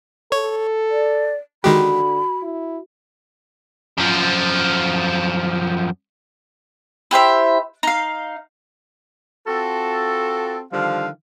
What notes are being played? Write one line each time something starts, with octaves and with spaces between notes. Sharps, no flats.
A4 C#5
D5
D3 D#3 G#3 F#4 G4 B5
E4
F#2 F3
E4 G4 C5 E5
D#4 F5
C4 F4 F#4 A4
D3 D#3 F3 G3 F5